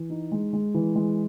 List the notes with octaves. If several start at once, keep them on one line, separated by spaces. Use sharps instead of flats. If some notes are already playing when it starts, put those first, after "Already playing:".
Already playing: E3
D#4
G#3
G#3
E3
G#3